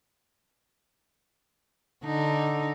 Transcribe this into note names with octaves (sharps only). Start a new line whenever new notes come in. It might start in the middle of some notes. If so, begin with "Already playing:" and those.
D3 D#4